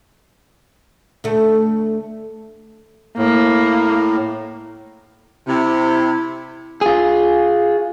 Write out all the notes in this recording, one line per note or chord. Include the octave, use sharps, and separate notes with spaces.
D2 A3
A2 A#3
C3 E4
F4 G#4